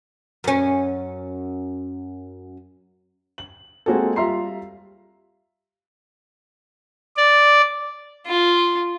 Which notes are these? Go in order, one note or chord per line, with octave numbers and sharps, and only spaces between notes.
F#2 C#4
F#7
G#3 A#3 C4 F#4 G#4 A4
G3 F4 E5 A#5 C6 C7
D5
F4